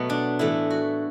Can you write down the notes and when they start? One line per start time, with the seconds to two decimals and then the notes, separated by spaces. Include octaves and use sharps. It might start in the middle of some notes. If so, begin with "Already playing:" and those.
Already playing: B2 F#3 A3 B3
0.10 D4
0.39 A2 E3 A3 E4
0.71 F#4